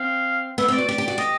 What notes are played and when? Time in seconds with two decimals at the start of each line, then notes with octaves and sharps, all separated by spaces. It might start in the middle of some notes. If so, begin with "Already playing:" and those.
Already playing: C4 F5
0.58 B3 E5
0.68 C4
0.73 D5
0.78 F#4
0.88 G4 D5
0.98 G4
1.08 F#4
1.18 G4 D#5